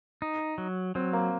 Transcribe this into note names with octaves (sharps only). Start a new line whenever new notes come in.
D#4
F#3
F#3 C4
A#3